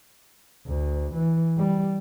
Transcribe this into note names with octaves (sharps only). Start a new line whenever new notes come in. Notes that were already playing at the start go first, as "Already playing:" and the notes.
D2
E3
G3